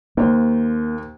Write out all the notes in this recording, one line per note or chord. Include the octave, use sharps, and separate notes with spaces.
D#2 A#3 C5